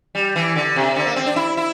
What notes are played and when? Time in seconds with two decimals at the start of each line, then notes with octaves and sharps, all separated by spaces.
0.15 G3
0.36 E3
0.56 D3
0.76 C3
0.96 D3
1.06 A#3
1.16 C4
1.26 D4
1.36 E4
1.57 E4